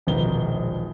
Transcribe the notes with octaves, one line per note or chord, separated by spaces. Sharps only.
E1 A#1 D#3 B4 G7